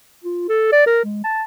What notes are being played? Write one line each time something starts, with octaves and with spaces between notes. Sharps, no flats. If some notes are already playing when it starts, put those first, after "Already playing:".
F4
A4
D5
A#4
G#3
A5